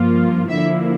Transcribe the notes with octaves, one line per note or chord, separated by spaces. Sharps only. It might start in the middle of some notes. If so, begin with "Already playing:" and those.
Already playing: G2 F3 A#3 F4
D3 F3 A#3 E4 E5